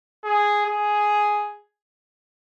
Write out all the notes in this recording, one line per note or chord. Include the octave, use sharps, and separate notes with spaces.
G#4
G#4